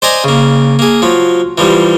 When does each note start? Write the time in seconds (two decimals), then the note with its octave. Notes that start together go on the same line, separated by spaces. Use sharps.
0.02 C5 D5 D#5 G#5 A#5
0.24 C#3 A#3
0.79 A#3 G#4
1.02 F3 F#3
1.58 E3 F3 G3